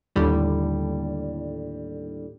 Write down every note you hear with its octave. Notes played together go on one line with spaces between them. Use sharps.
D#2 A2 D3 G3